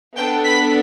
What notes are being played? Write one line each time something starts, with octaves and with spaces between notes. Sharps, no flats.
B3 D4 A4 G5 G6
B5 B6